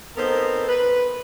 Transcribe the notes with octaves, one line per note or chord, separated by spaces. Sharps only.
B3 C4 D#4 A4 A#4 C5
B4